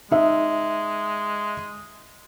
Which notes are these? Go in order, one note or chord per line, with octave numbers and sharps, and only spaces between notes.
G#3 D#4 E5